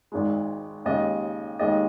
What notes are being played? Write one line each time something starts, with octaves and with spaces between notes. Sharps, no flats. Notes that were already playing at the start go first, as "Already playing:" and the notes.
G#1 G#2 D#3 G#3
D#2 C#3 G#3 D#5
D#2 D#3 G#3 D#5